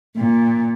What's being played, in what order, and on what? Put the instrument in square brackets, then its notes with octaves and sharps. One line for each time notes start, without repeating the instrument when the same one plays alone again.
[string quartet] A#2